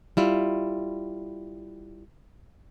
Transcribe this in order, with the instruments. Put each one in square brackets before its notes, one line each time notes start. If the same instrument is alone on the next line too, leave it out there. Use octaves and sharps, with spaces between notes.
[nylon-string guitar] G3 E4 F4